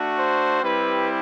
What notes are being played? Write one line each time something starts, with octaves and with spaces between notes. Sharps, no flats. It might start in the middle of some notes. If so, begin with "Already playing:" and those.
Already playing: A3 D4 F#4
C5
G3 C4 E4 G4 B4